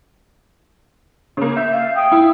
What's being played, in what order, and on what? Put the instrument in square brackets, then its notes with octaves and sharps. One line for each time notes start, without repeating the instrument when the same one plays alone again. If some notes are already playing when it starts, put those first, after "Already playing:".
[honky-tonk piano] C#3 A#3
[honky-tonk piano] E5 [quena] G6
[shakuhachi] F5
[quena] G5 [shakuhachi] D#6
[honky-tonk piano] E4